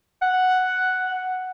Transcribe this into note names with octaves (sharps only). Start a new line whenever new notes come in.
F#5